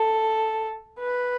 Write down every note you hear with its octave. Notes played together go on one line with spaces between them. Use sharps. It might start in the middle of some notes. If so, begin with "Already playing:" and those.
Already playing: A4
B4